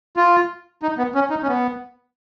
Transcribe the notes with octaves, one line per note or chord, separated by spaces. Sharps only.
F4
D#4
B3
C#4
D#4
C#4
B3